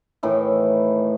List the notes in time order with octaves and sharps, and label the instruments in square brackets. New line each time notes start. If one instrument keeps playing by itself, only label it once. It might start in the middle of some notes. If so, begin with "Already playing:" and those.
[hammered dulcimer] A2 D#3 E3